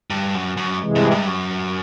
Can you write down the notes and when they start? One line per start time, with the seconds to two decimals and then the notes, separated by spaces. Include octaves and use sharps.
0.10 G2
0.35 F#2
0.57 F#2
0.80 C3 E3 G#3
0.96 G2
1.11 G2
1.27 F#2